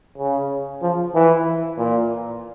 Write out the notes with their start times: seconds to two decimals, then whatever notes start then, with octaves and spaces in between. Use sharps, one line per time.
0.18 C#3
0.82 F3
1.14 E3
1.78 A#2